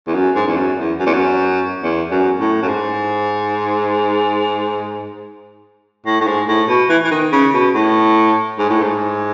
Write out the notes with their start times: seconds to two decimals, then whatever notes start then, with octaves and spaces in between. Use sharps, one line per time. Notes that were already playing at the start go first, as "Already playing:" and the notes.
0.07 E2
0.14 F#2
0.36 G#2
0.47 E2
0.57 F#2
0.78 E2
0.99 F#2
1.06 E2
1.13 F#2
1.83 E2
2.11 F#2
2.40 A2
2.62 F#2
2.68 G#2
6.06 A2
6.21 A2
6.27 G#2
6.48 A2
6.68 B2
6.89 E3
7.05 E3
7.11 D#3
7.32 C#3
7.54 B2
7.75 A2
8.59 G#2
8.70 A2
8.82 G#2